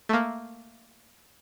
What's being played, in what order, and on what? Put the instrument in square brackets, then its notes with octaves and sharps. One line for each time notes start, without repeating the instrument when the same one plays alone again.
[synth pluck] A3 A#3